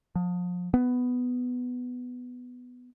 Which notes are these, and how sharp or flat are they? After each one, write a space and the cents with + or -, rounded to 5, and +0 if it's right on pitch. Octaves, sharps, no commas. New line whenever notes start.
F3 +35
B3 +5